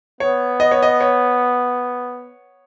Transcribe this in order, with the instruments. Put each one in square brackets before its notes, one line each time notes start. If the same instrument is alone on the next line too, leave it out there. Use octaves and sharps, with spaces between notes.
[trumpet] B3 [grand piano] C#5
[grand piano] D#5
C#5
D#5
C#5